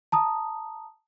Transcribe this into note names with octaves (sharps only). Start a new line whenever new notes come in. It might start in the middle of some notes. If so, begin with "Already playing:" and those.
A5 A#5 D#6